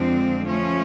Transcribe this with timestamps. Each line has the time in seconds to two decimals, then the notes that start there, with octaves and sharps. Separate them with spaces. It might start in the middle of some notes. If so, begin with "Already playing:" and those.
Already playing: F2 D3 F3 G#3 C4
0.44 F3 A3 C#4